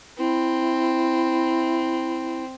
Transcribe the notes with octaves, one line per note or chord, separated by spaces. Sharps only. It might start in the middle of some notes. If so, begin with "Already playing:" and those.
C4 E4